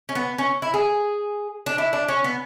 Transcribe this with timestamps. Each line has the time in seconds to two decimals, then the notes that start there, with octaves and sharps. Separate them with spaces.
0.09 C#4
0.15 B3
0.38 C#4
0.62 E4
0.74 G#4
1.66 D4
1.78 E4
1.93 D4
2.08 C#4
2.24 B3